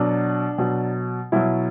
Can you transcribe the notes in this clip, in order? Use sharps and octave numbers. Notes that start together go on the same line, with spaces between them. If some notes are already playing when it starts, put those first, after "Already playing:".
Already playing: B2 F#3 D4
B2 F#3
B2 F#3 E4